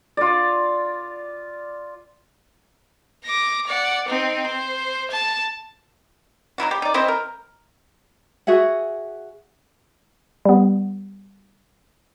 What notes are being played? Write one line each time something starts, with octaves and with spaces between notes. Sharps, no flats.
F4 D5
D6 A#6
D5 F#5
C4 D#4
C5
A5
F#3 D#4 E4 F#4
G4
D#4 D5
C4 E4 C5 D#5
A#4
F#4 G#4 E5 F#5
G3 B3